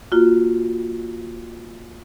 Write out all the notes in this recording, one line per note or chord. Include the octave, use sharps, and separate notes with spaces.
A#3 F4 F#4